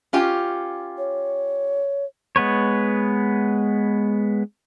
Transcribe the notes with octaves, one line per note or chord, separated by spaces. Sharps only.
C#4 F4 G4
C#5
G#3 B3 B4 C#5